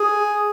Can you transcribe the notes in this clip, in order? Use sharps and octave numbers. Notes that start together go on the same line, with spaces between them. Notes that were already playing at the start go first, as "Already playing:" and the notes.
Already playing: G#4